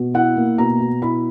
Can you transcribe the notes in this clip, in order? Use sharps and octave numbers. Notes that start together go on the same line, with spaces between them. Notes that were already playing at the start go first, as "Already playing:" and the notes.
Already playing: B2
E4 F#5
A#3
B2 A#5
B2
E4 B5